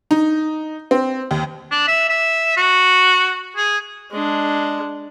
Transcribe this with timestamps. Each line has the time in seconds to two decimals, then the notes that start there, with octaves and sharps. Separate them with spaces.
0.11 D#4
0.91 C4
1.31 D#2
1.71 D4
1.88 E5
2.09 E5
2.57 F#4
3.56 G#4
4.11 G#3 D4